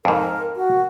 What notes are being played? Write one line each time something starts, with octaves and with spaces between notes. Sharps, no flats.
F2 G#2 A#4
F#4